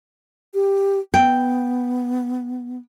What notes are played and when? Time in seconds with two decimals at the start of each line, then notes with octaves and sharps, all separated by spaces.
0.54 G4
1.14 B3 G5